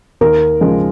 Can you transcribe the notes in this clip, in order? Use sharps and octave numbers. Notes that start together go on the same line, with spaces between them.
D#2 A#4
C#3 F3 G#3 D#4